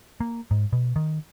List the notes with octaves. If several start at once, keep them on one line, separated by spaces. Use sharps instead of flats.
A#3
G#2
B2
D#3